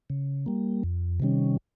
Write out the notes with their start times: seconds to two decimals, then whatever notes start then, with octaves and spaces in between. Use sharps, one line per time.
0.10 C#3
0.46 G3 A#3
0.83 F2
1.20 C3 D#3 G3 C#4